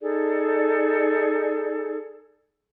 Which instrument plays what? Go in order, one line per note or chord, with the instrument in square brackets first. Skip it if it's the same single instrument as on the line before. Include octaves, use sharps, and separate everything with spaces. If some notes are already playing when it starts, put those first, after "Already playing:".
[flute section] D#4 G#4 A4 D5